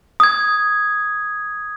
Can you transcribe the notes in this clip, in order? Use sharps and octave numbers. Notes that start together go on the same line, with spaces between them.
D#6 G#6